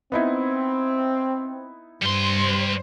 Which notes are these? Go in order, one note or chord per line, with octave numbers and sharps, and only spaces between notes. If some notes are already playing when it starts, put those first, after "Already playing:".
B3 C4 D#4 E4
G2 G3 C5 C6